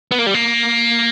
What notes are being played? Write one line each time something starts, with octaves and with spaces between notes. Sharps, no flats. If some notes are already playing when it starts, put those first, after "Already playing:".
B3
A#3
G3
A#3